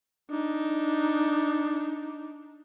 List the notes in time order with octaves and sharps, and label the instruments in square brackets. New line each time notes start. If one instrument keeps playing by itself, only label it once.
[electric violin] D4 D#4